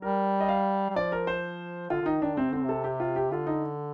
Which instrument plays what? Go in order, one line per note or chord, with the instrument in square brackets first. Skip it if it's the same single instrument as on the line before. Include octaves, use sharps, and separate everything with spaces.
[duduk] G3 [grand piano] A#4
[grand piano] D#5
F5
[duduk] G3
[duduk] F3 [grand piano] D5
[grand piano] A#4
C5
[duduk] D3 [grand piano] F4
[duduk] D3
[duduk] D#3 [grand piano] D#4
[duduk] D#3 [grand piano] D4
[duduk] C3 [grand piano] C4
[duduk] D3 [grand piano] C4
[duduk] C3
[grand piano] A4
G4
F4
G4
[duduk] D3 [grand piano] F4
[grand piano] D#4